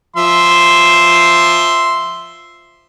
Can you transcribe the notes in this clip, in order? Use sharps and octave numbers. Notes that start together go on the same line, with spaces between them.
F3 E5 C6